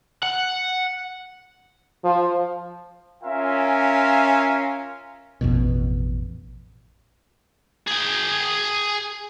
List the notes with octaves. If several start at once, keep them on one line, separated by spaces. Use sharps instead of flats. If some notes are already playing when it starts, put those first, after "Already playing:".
F#5
F3
C#4 F4 A#4 E5 F5 G#5
A1 F2 B2
G#4 G5